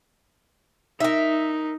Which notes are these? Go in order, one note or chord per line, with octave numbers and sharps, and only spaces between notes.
D#4 A#4 E5